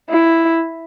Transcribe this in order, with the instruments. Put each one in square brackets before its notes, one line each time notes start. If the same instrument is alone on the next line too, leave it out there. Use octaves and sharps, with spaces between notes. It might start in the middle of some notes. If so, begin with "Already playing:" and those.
[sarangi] E4